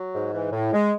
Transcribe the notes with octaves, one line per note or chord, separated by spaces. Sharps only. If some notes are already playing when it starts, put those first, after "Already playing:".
Already playing: F#3
G#2
E3
A2
G#3